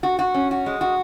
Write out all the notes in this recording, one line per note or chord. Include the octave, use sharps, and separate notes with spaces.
F#4
F#4
C#4
F#4
G#3
F#4